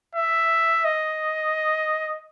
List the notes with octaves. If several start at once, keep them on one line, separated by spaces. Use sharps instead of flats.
E5
D#5